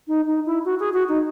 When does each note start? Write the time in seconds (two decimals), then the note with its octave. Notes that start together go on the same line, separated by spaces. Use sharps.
0.08 D#4
0.26 D#4
0.45 E4
0.65 F#4
0.79 G#4
0.93 F#4
1.08 D#4